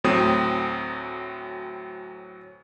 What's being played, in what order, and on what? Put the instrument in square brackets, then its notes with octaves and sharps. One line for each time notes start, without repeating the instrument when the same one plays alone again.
[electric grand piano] D2 A2 F#3 C4 D#6